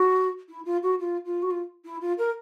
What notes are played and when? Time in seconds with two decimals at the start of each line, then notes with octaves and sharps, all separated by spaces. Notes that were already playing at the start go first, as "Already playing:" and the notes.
Already playing: F#4
0.49 E4
0.65 F4
0.83 F#4
0.99 F4
1.25 F4
1.42 F#4
1.50 F4
1.85 E4
2.01 F4
2.18 A#4